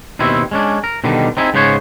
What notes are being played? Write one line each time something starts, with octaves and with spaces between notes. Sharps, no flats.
D#2 B2 C4 E4
G#3 C#4 D4
A#4
B2 D3 D#3 G3
C4 D#4 E4 G#4
G#2 C#3 B3 C5 C#5